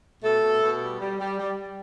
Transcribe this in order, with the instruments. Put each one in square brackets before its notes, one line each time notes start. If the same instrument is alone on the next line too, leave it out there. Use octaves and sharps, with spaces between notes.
[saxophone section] B2 A3 A4
B2
B2
G3
G3
G3
G3
G3